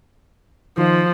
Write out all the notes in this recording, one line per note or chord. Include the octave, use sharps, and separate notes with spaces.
D#3 F3 D#4